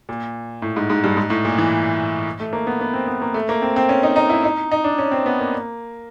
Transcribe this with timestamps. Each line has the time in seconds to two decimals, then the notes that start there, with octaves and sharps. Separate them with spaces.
0.09 A#2
0.62 A2
0.76 G#2
0.90 G#2
1.04 G2
1.17 G#2
1.30 A2
1.45 A#2
1.58 E3
2.40 A3
2.53 A#3
2.67 B3
2.81 B3
2.93 C4
3.07 B3
3.22 A#3
3.34 A3
3.49 A#3
3.62 C4
3.76 C4
3.89 C#4
4.03 D#4
4.16 D#4
4.29 E4
4.44 D#4
4.71 D#4
4.84 D4
4.98 C#4
5.11 C4
5.26 B3
5.39 A#3